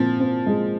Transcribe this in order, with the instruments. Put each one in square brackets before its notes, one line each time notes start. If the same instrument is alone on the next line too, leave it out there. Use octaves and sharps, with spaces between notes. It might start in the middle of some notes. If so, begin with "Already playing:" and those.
Already playing: [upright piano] A#2 C4 [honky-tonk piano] F3
[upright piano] C4
G#3